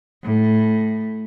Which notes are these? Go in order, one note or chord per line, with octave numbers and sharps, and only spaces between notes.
A2